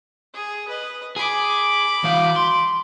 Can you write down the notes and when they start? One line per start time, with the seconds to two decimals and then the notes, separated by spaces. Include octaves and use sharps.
0.34 G#4
0.68 B4 D#5
1.16 G#4 B5 D6
2.04 E3 F5
2.36 C6